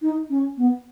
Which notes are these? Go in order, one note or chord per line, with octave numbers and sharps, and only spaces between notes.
D#4
C#4
B3